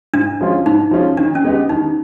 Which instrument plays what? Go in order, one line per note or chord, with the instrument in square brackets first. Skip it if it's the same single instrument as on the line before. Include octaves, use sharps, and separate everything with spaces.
[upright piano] G#2 [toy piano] D4
[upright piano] F3 G#3 C#4 F4
[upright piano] G#2 [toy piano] D#4
[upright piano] F3 G#3 C#4 F4
[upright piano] D#3 [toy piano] D4
[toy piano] C#4
[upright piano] G#3 B3 D#4 G4
[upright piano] D#3 [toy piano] D#4